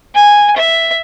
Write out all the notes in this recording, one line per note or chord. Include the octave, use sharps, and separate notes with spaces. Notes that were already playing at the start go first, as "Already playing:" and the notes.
G#5
E5